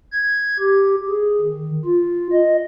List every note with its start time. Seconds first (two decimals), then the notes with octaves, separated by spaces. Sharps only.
0.12 G#6
0.59 G4
1.09 G#4
1.41 D#3
1.85 F4
2.32 D#5